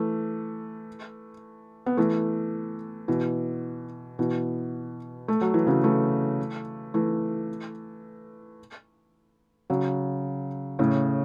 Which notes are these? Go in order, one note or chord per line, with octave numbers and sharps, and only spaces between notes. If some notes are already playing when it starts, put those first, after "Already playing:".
Already playing: E3 A3
B3
E3 A3
B2 E3
B2 E3
A3
F#3
E3
C#3 F#3
E3 A3
E3 A3
C#3 F#3
A2 C#3